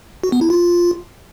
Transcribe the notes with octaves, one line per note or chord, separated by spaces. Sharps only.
F#4
B3
E4
F4